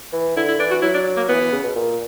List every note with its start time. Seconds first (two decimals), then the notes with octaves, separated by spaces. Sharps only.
0.13 E3
0.36 D3 E4
0.48 E4
0.59 E3 D4
0.71 F#4
0.82 F#3 E4
0.94 D4
1.16 A#3
1.29 E3 B3
1.41 E3
1.52 C#3
1.63 B2
1.75 A#2